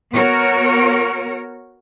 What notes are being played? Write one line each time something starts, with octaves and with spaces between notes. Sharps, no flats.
B3 F#4 A#4 C#5